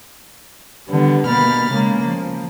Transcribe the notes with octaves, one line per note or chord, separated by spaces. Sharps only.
D3 D#3 G3 B3
B2 A#3 B5 F6 A6
C#3 G#3 A#3
F3